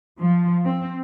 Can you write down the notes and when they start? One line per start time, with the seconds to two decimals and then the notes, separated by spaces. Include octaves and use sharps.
0.20 F3
0.64 C4